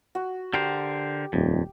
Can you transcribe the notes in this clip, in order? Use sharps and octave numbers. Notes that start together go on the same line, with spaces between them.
F#4
D3 G4 A#4 C5
D#1 F2